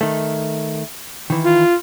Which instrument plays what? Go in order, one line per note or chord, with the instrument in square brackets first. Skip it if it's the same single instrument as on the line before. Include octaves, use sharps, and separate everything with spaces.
[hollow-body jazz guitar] D#3 A3
D#3 E3
[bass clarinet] F4